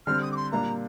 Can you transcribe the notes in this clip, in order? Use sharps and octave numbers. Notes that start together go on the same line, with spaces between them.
D3 G3 C4 F6
D#6
D6
C6
A#2 G3 A#3 D4 A#5